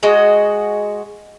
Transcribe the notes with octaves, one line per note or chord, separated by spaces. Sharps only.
G#3 F#4 D#5